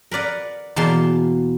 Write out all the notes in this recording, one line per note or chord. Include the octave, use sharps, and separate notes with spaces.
A#4 B4 D5 F#5
E2 B2 A#3 A5 C6